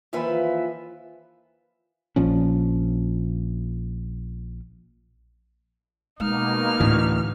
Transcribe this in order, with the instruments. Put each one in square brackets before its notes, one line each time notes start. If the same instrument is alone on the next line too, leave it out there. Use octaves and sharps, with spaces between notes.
[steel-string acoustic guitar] D#2 E3 F3 F4 B4 E5
[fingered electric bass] A#1 A#2 F3 C#4
[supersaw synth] B2 A#3 [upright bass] G#3 [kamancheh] D#4 F6
[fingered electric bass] D2 E3 [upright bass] A2 C#4